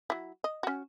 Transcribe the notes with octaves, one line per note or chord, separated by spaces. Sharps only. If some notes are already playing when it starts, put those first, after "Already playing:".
F#3 E4
D#5
C#4 F#4